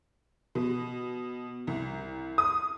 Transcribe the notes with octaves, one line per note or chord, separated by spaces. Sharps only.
B2
C2
D#6